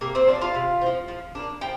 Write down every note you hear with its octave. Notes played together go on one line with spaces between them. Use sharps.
C3 A#3 A#4
C4 C5
F3 C4 D4 D5
F4 F5
C3
F3 C4
F3
A#3 D4
F3 G5